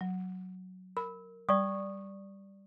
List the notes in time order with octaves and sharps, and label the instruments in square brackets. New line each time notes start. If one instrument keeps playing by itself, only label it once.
[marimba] F#3
[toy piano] A#4 [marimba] B5
[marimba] G3 [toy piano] D5 C#6 D#6